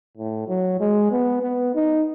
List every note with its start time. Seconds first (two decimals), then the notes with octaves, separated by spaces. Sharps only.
0.18 A2
0.48 F#3
0.80 G#3
1.11 B3
1.43 B3
1.75 D#4